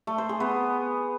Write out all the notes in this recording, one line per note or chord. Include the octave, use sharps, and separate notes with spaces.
A3
C5
G#4
B3